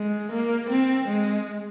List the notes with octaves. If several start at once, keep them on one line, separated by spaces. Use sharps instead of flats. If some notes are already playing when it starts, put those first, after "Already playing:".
Already playing: G#3
A#3
C4
G#3